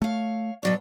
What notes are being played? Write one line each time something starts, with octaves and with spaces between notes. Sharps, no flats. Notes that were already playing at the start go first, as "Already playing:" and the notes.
A3 C#5 F5
B2 F#3 C#5 D5